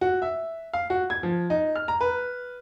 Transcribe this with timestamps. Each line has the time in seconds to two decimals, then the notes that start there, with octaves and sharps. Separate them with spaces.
0.01 F#4
0.22 E5
0.73 F5
0.90 F#4
1.10 G#6
1.23 F3
1.50 D#4
1.76 F6
1.88 A#5
2.01 B4